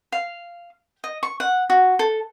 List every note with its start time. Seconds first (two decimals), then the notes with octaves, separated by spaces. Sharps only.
0.12 F5
1.04 D#5
1.23 C#6
1.40 F#5
1.70 F#4
1.99 A4